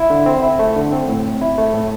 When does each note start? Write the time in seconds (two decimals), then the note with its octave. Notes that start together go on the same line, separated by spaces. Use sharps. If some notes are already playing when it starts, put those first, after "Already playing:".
Already playing: E4
0.10 D3
0.26 C4
0.43 E4
0.59 A3
0.76 D3
0.92 C4
1.08 A2
1.24 C4
1.41 E4
1.58 A3
1.74 A2